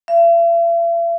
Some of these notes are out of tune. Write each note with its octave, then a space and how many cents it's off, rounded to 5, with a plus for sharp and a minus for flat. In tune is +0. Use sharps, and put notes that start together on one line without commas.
E5 +45